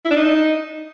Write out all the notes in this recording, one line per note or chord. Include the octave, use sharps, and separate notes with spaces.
E4
D4
D#4